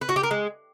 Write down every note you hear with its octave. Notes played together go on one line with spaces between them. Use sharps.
B4
F#4
G4
A#4
G#3